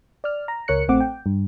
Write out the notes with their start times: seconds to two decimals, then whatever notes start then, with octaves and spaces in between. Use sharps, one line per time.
0.24 D5 F6
0.48 A#5
0.68 C#2 A#4 C#5 F#6 C#7
0.88 A1 A3 C4 F#5 D6
1.00 G5
1.26 G2